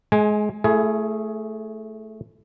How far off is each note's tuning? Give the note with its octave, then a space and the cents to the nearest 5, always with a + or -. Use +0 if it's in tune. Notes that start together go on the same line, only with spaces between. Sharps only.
G#3 +25 G#5 +0
A3 -5 E4 +30 G#4 +15